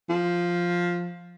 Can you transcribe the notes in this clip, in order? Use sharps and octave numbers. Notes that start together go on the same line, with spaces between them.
F3